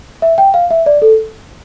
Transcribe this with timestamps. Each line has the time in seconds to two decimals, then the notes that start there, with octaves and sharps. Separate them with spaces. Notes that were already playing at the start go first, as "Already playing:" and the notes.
0.22 E5
0.38 G5
0.54 F5
0.71 E5
0.86 D5
1.02 A4